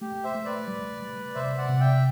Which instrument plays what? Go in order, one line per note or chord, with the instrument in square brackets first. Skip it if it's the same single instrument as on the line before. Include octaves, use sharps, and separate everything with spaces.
[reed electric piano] A3 [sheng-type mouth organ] G4
[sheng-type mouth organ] C5 E5
[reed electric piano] A3
[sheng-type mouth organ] B4 D5
[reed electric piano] G3
G3
[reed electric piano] C3 [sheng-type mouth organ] C5 E5
[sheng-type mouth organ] D5 F#5
[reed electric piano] C3
[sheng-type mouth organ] E5 G5